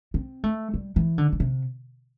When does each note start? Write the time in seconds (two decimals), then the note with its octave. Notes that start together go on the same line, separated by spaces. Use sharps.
0.14 C4
0.44 A3
0.74 G3
0.96 E3
1.18 D3
1.33 D3
1.40 C3